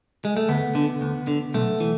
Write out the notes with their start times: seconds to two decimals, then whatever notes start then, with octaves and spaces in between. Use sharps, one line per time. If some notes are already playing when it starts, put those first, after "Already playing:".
0.25 G#3
0.37 A3
0.49 D2 B3
0.75 D3
1.01 D2
1.27 D3
1.54 B1 A3
1.80 E3